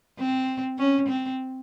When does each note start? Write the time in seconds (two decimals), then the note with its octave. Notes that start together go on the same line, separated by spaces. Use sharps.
0.18 C4
0.78 C#4
1.08 C4